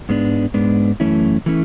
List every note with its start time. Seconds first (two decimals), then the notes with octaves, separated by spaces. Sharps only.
0.09 G#2 G#3 B3 D4
0.54 G#2 G#3 B3 D4
1.00 F#2 E3 A3 C#4 E4
1.46 E3 A3 C#4 E4